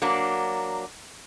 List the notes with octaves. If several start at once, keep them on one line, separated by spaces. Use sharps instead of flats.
F#3 A#3 D4